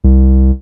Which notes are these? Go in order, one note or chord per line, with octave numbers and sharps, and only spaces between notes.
C2